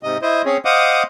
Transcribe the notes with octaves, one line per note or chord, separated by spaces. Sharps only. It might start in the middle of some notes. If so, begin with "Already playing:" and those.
G#2 C3 D#5
E4 C5 D#5
C4 C#4 G#4 C#5
C5 D#5 F5 F#5 D6 D#6